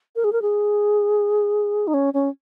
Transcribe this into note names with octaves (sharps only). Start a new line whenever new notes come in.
A#4
G#4
A#4
G#4
D#4
C#4
C#4